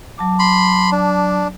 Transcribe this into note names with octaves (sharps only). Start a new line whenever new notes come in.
F#3 A5 D6
B5 C6
D4